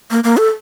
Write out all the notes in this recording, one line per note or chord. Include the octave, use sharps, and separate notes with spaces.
A#3
A#3
A4